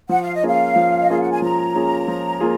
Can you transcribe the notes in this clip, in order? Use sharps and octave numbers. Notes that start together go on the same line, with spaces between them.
F3 F#5
F5
D#5
A#3 C#4 F4 G#4 F5
F3
D#5
A#3 C#4 F4 G#4 F5
F#5
G#5
F3 A#5
A#3 C#4 F4 G#4
F3
A#3 F4 G#4